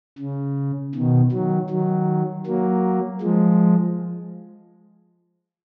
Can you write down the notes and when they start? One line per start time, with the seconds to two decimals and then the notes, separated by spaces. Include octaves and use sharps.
0.18 C#3
0.95 B2 D#3
1.32 D#3 F#3
1.70 D#3 F#3
2.46 F#3 A#3
3.22 F3 G#3